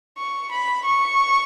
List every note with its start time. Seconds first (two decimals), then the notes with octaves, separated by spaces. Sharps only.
0.18 C#6
0.52 B5
0.85 C#6